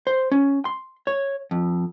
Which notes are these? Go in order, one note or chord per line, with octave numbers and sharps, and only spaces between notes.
C5
C#4
C6
C#5
F2